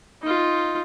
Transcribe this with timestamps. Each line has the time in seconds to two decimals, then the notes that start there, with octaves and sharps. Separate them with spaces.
0.22 D#4 F4